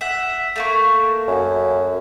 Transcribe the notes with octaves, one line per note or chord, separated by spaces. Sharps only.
E5 F#5
A3 A#3 C#6
F#2